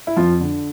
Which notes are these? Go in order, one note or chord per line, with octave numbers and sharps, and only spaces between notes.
E4
F2 F3 F4
D3